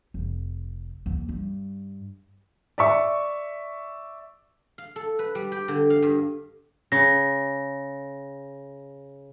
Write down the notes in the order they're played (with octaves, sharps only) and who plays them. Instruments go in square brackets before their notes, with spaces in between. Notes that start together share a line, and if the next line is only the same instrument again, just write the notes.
[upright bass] F1
D#2
G2
[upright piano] D5 E5 C#6
[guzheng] F5
A4
B4
G3
G4
D3
F5
G2
[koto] C#3 [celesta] A#6